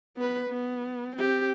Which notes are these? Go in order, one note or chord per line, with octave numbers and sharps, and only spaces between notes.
B3 B4
B3
C4 G4